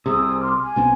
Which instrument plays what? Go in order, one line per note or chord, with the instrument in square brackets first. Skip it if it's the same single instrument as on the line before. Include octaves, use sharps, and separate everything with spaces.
[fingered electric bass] C2 C3 [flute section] G#4 D#6 E6
[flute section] C6 D6 F6
G#5
[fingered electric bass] B1 B3 C4